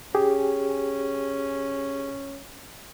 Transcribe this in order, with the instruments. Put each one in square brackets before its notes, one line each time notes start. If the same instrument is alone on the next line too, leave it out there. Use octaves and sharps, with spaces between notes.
[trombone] C#4 [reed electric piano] G4 G#4